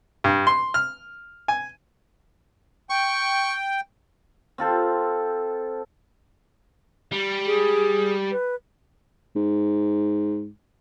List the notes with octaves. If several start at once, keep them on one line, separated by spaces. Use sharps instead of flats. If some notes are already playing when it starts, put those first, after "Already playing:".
G2
C6
F6
G#5
G5 C#6
C4 F4 A4 C5
G3
G#4
B4
G#2